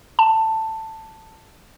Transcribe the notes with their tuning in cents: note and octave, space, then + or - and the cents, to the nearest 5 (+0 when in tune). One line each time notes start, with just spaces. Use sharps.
A5 +10